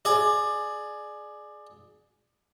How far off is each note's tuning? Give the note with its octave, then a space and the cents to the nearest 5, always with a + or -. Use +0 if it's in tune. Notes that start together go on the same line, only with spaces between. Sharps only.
G#4 +20 D5 +20